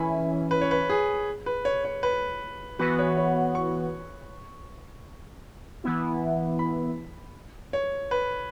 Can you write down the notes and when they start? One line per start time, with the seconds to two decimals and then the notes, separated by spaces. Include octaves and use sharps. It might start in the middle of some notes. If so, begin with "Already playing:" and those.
Already playing: E3 C#4 E4 G#5 B5
0.51 B4
0.61 C#5
0.71 B4
0.89 G#4
1.46 B4
1.65 C#5
1.85 C#5
2.03 B4
2.79 E3 B3 F#4 B4
2.99 C#5
3.17 C#5
3.55 C#6
5.84 E3 B3 E4
6.59 B5
7.73 C#5
8.11 B4